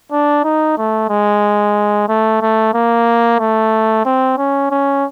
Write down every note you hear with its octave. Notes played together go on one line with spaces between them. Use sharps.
D4
D#4
A3
G#3
A3
A3
A#3
A3
C4
C#4
C#4